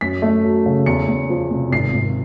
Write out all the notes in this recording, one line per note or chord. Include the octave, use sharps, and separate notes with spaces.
F#2 B6
A3
F#3
C#3
E2 C#7
E2
F3
C3
G#1 C7
G#1